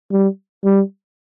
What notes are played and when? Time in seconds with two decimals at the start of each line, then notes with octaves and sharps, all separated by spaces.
0.12 G3
0.64 G3